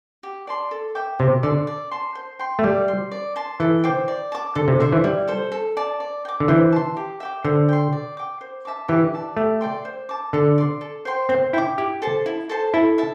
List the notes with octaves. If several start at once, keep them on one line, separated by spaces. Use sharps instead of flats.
G4
D5 A5 C6
A4
E5 G5 D6
C3 G4
D3 D5 A5 C6
D5
A5 C6
C5
G5 C6
A3
G3 D5
C6
D5
A5 C6
E3 A4
C5 G5 D6
D5
A5 D6
D3 A4
C3
D3 C5 E5
E3
G3 E4
A4 C5
A4
D5 A5
D5
G5
D6
D3
E3 C5
A5 C6
G4
E5 G5 D6
D3 C5
G5 C6
D5
G5 D6
C5
E5 A5 D6
E3 G4
D5 A5
A3 G4
D5 G5 C6
C5
A5 D6
D3 A4
D5 C6
A4
C5 G5 C6
C4 C5
E4 G5 D6
E4 G4
A4 C5 A5
E4
A4 C5 A5
E4 A4
E5 A5